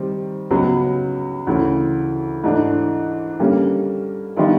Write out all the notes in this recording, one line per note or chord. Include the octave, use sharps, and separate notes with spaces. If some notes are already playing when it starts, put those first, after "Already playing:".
Already playing: D#3 G3 C4
C#2 C#3 F#3 B3
D2 C#3 E3
G#2 E3 A3 D4
D3 G3 A#3 C#4
D#3 G3 B3 D4 F4